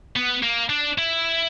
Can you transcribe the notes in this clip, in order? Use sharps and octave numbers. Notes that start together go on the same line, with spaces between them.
B3
A#3
D4
E4